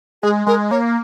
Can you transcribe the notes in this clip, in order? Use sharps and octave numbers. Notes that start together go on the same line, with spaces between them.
G#3 G#4
G#3 A#4
A#3 C#5